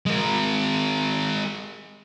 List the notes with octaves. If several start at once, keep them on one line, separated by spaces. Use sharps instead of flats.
G#3 A#4